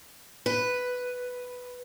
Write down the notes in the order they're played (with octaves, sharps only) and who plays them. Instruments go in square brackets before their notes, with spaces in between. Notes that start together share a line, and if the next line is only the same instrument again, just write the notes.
[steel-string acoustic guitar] B4